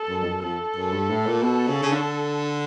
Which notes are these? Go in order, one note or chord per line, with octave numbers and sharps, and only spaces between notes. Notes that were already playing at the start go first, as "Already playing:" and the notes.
Already playing: A4
F#2
F2
F#2
F2 A4
F#2
G2
A2
A#2
B2 A4
C#3
C#3
D3